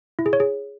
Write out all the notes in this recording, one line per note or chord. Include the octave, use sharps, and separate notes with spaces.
E4
G#4
C#5
G#4